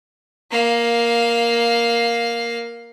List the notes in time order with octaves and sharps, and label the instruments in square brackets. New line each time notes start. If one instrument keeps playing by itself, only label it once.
[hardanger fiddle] A#3 F5